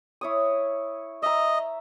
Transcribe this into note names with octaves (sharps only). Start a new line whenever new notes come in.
E4 C#5 D#6
D#5 E5 A#5